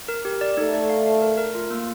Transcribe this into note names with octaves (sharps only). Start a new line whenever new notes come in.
A#4
G4
D5
A3 D#4
D5
F5
F5
A#4
A#4
F4
A#3